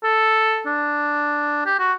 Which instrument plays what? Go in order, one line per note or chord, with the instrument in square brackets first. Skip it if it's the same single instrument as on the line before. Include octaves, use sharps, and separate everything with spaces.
[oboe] A4
D4
G4
F#4